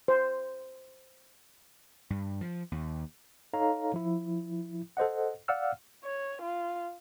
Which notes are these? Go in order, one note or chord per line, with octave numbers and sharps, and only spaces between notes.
C5
G2
F3
D#2
D#4 A4 C#5 F5 A#5
F3 E4
A4 C5 D#5 F#5
D5 F5 F#5 E6 F6
C#5
F4